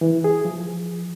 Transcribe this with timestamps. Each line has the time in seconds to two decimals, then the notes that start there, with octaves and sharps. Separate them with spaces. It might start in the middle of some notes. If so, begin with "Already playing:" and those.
0.01 E3
0.24 G#4
0.45 F3